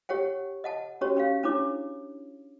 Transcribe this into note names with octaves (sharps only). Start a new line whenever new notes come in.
G4 C#5 F#5 G5
D#5 F#5 A5
C#4 F#4 G4 C#5
C#4 G4 F5
C#4 D4 E4 C#5 D6